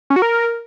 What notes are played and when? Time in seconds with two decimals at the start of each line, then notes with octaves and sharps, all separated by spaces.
0.10 C#4
0.16 F#4
0.22 A#4